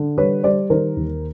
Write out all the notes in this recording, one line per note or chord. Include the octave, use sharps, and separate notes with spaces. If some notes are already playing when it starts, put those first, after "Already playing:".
Already playing: D3
G3 B4 C#5
G3 C5 D5
D#3 A#4 C5
D#2